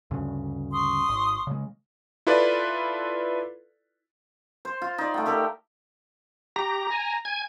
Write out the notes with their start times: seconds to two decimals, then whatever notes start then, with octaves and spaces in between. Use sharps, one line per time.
0.11 D2 G2 C#3
0.72 C6 C#6 D#6
1.08 G#1
1.47 C#3 G#3
2.27 E4 F4 A4 B4 D5
4.65 C5
4.82 F4
4.98 D#4 D5
5.14 A3 F#5 G5
5.26 A3 G4 A4 A#4
6.56 G4 A#5
6.90 G#5
7.25 G#5 G#6